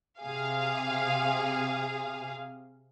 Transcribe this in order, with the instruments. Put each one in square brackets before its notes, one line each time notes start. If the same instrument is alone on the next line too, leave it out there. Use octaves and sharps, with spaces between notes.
[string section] C3 G#4 F5